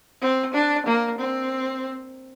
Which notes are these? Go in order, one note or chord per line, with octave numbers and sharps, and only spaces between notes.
C4
D4
A#3
C4